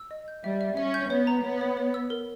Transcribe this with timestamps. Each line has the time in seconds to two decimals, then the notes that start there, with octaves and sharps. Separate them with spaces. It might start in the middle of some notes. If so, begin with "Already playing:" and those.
Already playing: E6
0.11 D#5
0.28 G6
0.44 G3 E5
0.61 E5
0.77 C#4 E5
0.94 G6
1.10 B3 C#5
1.27 A#5
1.44 B3 C#5
1.61 C#5
1.77 C#5
1.94 E6
2.10 A#4